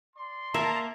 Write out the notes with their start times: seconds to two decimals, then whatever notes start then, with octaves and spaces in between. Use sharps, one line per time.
0.16 D5 C6
0.54 A#3 E5 A5 A#5